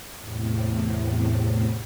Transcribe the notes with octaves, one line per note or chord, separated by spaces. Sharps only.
E2 A2 C3